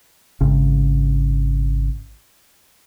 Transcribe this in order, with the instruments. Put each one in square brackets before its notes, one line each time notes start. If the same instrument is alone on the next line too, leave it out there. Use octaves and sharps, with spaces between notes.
[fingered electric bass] G#1 C#3